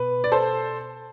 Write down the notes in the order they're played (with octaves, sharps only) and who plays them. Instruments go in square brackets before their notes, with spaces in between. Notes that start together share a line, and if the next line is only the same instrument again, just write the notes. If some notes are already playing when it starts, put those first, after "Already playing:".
Already playing: [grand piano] B2 B4
D5
A4 C5